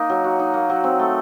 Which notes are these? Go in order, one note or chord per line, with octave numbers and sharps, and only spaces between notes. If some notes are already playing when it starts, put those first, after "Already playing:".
Already playing: A#3 D#4
F#3
F#4
D#4
A#3
F#3
C4
A3